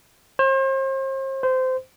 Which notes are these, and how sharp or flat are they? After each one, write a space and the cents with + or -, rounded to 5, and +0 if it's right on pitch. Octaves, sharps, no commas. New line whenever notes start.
C5 +40
C5 -20